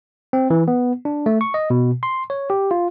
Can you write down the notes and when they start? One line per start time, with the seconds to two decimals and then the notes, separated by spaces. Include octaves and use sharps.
0.33 C4
0.50 E3
0.68 B3
1.05 D4
1.26 A3
1.41 C#6
1.54 D#5
1.70 B2
2.03 C6
2.30 C#5
2.50 G4
2.71 F4